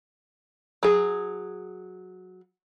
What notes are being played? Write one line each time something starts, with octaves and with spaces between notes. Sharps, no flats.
F#3 G#4